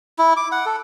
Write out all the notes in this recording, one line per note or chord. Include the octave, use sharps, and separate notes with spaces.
E4
D6
F#5
A4